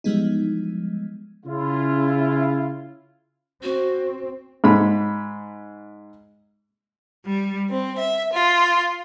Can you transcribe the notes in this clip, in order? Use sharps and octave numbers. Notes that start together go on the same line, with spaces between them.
E3 F3 G3 G#3 B3 D#4
C#3 E4 F4
C4 F#4
G#2 B5
G3
C4
E5
F4